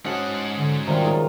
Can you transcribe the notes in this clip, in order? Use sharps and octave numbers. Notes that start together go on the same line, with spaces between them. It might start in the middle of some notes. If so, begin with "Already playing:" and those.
G#2 C#4 F#4 D#5 F#5 A5
D3
C3 D#3 G3 F4
G#3 D#4 A#5